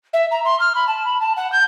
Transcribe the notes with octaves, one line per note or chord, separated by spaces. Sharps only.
E5
A#5
C6
F6
B5
A5
B5
A5
F#5
G6